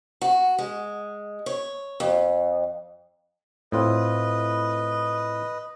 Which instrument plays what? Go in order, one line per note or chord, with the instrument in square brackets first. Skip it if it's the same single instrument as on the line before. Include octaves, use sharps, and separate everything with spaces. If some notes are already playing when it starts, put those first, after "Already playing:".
[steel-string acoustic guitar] F#4
G#3
C#5
F2
[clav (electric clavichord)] A2 C4 F4 [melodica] B4 D#5